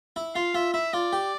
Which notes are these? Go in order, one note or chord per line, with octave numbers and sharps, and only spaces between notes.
E4
F4 F5
F4 E5
E4 E5
F4 D5
G4